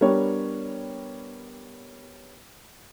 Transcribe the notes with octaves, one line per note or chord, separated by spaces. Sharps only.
G3 B3 D4 G4 A#4 C#5